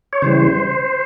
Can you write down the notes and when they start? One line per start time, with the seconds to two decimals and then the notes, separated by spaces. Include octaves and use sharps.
0.13 C#5
0.22 C#3 E3 G3 C5